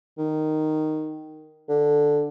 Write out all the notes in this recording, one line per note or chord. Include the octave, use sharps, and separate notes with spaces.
D#3
D3